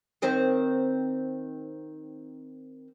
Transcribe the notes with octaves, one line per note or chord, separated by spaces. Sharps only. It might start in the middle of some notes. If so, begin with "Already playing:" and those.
D#3 C4 C5